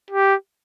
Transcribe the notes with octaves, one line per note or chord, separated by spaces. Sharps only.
G4